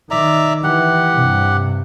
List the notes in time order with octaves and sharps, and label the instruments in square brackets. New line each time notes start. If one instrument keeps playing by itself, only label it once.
[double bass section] D#3 [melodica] D5 E5 A#5
[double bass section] E3 [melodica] G4 F#5
[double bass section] G2 C3